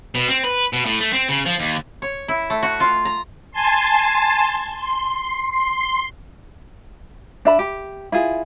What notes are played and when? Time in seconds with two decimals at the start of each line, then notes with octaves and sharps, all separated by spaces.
0.15 B2
0.28 C4
0.44 B4
0.73 B2
0.86 A2
1.01 A3
1.13 C4
1.29 C#3
1.46 F3
1.60 D#2
2.02 C#5
2.28 E4
2.50 A3
2.63 F#4
2.80 F4
3.05 A#5
3.51 G#5 A5 C6
4.77 C6
7.45 D4 E5 B5
7.59 G4
8.12 E4 F4 G#4